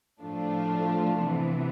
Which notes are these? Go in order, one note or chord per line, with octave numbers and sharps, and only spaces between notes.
A2 F3 A3 D4 F4
C3 E3 B3